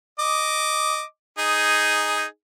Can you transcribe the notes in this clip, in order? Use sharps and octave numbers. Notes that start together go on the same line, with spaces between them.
D#5 D6
D#4 G#4